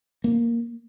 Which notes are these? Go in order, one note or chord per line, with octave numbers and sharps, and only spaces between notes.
A#3